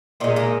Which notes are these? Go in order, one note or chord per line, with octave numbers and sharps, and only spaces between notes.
A#2 G#3 A#3 D#4
A#3 D#4